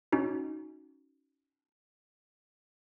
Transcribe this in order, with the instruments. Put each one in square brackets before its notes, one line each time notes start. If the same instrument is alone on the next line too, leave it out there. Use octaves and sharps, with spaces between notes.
[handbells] C#4 D#4 F#4